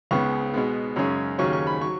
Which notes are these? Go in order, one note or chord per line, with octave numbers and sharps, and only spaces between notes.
C#2 C#3 B3 C#6
B2 G#3 B3
F#2 C#3 G#3 C#4
D#2 C#3 F#3 C#4 C#6
C#6
B5
F#3 C#6